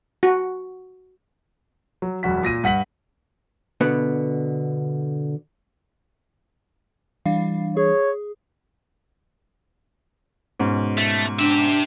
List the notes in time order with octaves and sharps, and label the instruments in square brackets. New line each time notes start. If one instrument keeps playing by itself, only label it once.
[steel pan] F#4
[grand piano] F#3
E1 F#2 F#4 B6
A#2 A#6 D#7
G2 F#5 B6 F#7
[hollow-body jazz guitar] B2 D3 B3
[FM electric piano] E3 G3 D4 [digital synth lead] F5
[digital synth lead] G#4 [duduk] C#5
[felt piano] G#2 B2 C#4
[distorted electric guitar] A3
[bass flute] D4 [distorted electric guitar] G4 E5